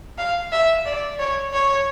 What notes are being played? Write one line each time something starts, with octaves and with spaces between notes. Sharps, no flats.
F5
E5
D5
C#5
C#5